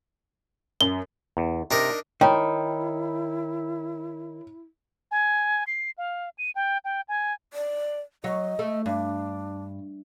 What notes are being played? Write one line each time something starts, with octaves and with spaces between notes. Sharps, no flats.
F#2 G7
E2
C3 D4 D#4 A#4
D#3 E4 C#5 G5 A#5 B5
G#5
C7
F5
D#7
G5
G5
G#5
D5
F#3 C#5 D#5
A3
G2 D4